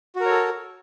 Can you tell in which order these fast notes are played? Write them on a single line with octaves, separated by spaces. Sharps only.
F#4 A#4 C#5 A4